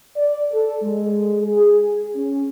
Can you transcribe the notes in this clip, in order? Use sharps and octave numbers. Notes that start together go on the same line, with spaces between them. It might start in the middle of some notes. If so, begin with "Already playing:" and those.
D5
A4
G#3
G#4
C#4